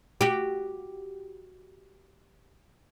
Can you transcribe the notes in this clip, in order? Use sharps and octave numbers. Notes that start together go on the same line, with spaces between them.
F#4 G4